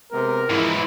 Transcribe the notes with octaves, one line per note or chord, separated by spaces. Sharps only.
C3 G#3 B3 A#4
E2 G#2 E3 F3 G#3 E4